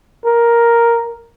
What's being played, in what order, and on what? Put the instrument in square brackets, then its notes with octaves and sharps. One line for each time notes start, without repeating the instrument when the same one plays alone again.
[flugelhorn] A#4